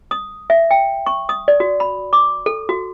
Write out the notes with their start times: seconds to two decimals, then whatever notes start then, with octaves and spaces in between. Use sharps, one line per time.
0.11 D#6
0.50 E5
0.71 G5
1.06 C#6
1.29 D#6
1.48 D5
1.60 F#4
1.80 B5
2.13 D6
2.46 A4
2.69 F#4